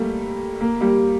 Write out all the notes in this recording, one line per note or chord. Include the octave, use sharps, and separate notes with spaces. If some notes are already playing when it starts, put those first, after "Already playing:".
Already playing: G3 A3 A#3
A#3
G3 A#3